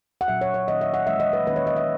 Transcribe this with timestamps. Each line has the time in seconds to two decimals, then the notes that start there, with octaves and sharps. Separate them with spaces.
0.21 F#5
0.28 A#2 F#3 C#4 E5
0.41 C#5
0.54 C#5
0.68 D#3 A#3 C#4 D#5
0.81 E5
0.94 F#5
1.07 E3 G#3 C#4 E5
1.20 D#5
1.33 B4
1.47 D#3 A#3 C#4 B4
1.56 C#5
1.67 D#5
1.76 E5